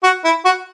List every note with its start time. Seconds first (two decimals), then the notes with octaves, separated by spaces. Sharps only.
0.03 F#4
0.24 E4
0.45 F#4